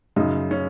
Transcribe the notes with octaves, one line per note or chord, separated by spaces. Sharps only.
F#2 C#3 D#4
C#4